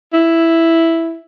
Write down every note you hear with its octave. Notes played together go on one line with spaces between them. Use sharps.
E4